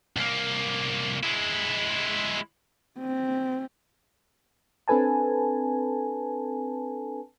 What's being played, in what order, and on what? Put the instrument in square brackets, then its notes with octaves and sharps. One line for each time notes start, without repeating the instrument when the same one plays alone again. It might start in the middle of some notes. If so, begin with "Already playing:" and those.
[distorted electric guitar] C2 A#3
G#3 E4
[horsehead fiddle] C4
[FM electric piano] C4 D4 A4 B4 G#5 A5